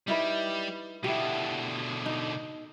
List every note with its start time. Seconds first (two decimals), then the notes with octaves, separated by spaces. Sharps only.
0.08 G3 D#4 E4 B4
1.04 B2 D3 E4 G4
2.06 D#4